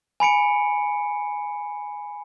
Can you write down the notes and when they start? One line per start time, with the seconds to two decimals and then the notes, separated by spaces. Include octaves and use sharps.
0.20 G#5 B5 C#7 D7